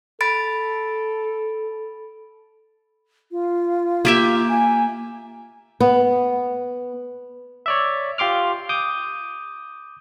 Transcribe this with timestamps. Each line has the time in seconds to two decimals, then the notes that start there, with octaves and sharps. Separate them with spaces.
0.21 A4 B5 A6 D7
3.32 F4
4.05 A#3 G4 E5
4.49 G#5
5.80 B3
7.66 C#5 D5 E5
8.18 F4 G4 C6 D6 F6
8.69 D6 D#6 G6